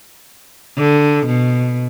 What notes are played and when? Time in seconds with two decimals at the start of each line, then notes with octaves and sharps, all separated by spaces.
0.77 D3
1.26 B2